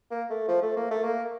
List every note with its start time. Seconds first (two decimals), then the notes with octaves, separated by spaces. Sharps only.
0.11 A#3
0.30 A3
0.48 F3
0.62 A3
0.77 A#3
0.91 A3
1.04 A#3